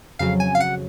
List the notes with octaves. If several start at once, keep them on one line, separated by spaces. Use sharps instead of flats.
F2 C#3 F#3 F5
G#5
F5
F#5